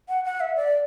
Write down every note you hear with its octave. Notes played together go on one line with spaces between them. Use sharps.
F#5
F#5
E5
D5